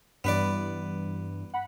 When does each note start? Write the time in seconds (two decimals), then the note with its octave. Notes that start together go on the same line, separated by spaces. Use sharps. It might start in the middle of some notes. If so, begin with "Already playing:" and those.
0.24 G2 E3 B3 B4 D5
1.54 F#5 B5